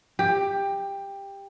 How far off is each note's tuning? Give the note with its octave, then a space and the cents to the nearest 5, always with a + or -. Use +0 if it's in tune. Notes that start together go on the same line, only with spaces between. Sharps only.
G4 +15